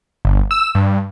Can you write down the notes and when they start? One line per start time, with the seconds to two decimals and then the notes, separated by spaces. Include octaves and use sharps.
0.25 G1
0.51 E6
0.75 G2